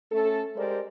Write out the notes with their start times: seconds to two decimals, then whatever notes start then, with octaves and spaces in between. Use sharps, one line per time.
0.11 A3 C#4 A4
0.56 G#3 G4 A#4 C5 D5